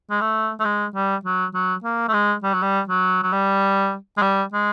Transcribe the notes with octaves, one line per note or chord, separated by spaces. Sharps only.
G#3
A3
A3
G#3
G3
F#3
F#3
A#3
A3
G#3
G3
F#3
G3
F#3
F#3
G3
G#3
G3
G#3